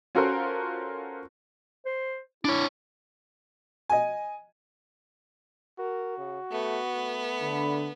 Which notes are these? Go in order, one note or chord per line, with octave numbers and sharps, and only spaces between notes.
C#4 F4 F#4 A4 A#4 C5
C5
D4 E4 C#5
D#5 G#5
F#4 A#4
C#3
A3 B3
A3
D3 B5